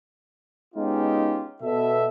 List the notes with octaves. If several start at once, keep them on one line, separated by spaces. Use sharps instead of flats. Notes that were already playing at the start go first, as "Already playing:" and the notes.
G#3 B3 C#4 D#4 F4 G4
B2 A4 E5